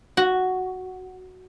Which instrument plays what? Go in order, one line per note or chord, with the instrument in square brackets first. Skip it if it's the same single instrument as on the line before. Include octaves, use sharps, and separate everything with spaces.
[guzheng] F#4